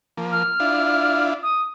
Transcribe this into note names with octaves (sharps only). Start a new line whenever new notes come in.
F3 A#3
F6
D4 E4 F4
D#6